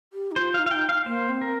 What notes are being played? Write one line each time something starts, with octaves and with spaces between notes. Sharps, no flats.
G4
D#4
F4 C5
F5
D#4
F4 F5
D#4 G5
F5
A#3 C5
C4
A#4